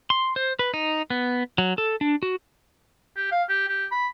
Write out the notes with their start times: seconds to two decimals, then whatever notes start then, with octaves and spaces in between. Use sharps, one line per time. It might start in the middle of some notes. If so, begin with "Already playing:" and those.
0.10 C6
0.36 C5
0.59 B4
0.74 D#4
1.10 B3
1.58 F#3
1.78 A4
2.01 D4
2.23 F#4
3.16 G4
3.31 F5
3.49 G4
3.68 G4
3.91 B5